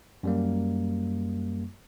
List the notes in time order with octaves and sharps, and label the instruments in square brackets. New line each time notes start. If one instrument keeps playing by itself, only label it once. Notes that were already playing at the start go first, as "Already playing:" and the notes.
[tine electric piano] F#2 G3 A#3